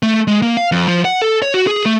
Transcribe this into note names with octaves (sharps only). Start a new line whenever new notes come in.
A3
G#3
A#3
F5
F2
F3
F#5
A4
C#5
F#4
G#4
A3